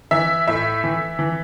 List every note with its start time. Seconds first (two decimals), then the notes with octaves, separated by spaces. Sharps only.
0.11 E3 E5
0.48 A2 E5
0.84 E3
1.19 E3